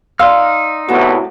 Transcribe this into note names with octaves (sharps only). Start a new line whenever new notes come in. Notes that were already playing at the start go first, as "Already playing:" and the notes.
D#4 D5 F5 C6 E6 F6
C2 A2 B3 F#4 A5